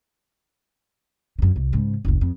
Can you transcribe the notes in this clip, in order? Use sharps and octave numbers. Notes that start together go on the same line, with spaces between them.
F#2 D3
C2
G#2 C#3
F#1 D2
F2